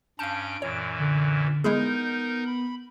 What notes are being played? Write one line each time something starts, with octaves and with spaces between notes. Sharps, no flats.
G2 C#4 F5 A5 G6 D7
F#2 A#2 E3 C#5
D3
G#3 B3 D#4 E4 G#4 A#4 G6
B5